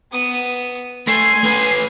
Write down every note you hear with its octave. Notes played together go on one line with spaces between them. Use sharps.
B3 D#6
A3 G#5 C6 C7
A3 B4